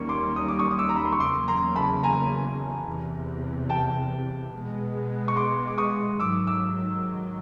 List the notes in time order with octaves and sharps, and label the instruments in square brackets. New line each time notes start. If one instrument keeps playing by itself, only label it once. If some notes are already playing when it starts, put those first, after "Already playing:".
Already playing: [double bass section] D#2 D#3 G3 A#3 C#4 [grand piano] C#6
[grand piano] C6 D6
D#6
D6
C#6 D#6
D#6
D6 E6
A#5
B5
C6
C#6
[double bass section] E2 C#3 F#3 A#3 C#4 [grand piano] C6 D6
[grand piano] A#5 C6
A5 B5
G#5 A#5
[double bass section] E2 C3 E3
[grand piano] G5 A5
[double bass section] B2 G#3 B3
[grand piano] C#6
C6 D6
D6
C#6 D#6
[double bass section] G#2 D#3 F#3 [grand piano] D6 E6
[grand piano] D6 E6